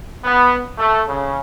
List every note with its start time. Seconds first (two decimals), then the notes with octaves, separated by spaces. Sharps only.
0.24 B3
0.78 A3
1.08 C#3